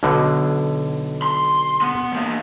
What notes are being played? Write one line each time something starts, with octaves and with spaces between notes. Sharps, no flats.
B1 B2 D3
C6
B3
E3 A#3